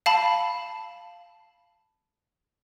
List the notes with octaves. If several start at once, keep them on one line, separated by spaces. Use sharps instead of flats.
F5 A5 B5